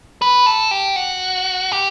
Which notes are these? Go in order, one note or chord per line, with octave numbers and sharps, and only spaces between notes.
B4
A4
G4
F#4
G4